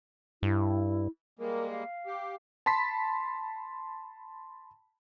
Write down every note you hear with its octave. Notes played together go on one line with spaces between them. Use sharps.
G2 E4
G3 G#3 A#3 A#4
F5
G4
A5 B5 C6 B6